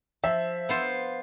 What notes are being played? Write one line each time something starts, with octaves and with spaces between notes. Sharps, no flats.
F3 E5
B3 F4 C5